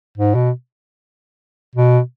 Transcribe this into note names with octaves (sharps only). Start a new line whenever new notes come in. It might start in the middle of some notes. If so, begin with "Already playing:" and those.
G#2
B2
B2